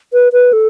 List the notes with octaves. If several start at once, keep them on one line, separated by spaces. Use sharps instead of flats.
B4
B4
A4